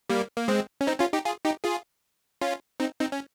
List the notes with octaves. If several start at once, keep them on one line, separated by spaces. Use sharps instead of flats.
G3 A#3
A#3
G#3 C4
C#4
C4 D#4
C#4 F4
D#4 G4
F4 G#4
D#4 G4
F4 G#4
C#4 F4
C4 D#4
C4 D#4
C#4